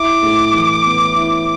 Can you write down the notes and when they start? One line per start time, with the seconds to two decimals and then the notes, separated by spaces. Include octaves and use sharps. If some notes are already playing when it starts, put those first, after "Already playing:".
Already playing: E4 D6
0.22 A2
0.53 E3
0.84 B3
1.15 E4